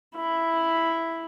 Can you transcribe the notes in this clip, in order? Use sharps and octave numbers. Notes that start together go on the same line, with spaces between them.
E4